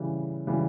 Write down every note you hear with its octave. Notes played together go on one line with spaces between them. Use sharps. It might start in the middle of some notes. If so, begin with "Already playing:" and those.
Already playing: C#3 E3 G3
C#3 E3 G3